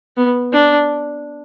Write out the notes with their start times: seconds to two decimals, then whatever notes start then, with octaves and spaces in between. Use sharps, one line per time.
0.17 B3
0.53 D4